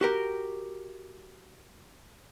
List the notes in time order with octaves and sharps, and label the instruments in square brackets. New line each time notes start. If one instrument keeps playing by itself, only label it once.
[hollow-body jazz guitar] F#4 G4 A#4